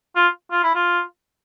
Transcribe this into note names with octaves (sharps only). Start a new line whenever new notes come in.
F4
F4
E4
F4